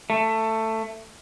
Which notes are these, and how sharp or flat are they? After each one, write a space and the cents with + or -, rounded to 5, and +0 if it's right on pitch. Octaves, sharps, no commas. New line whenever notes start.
A3 +15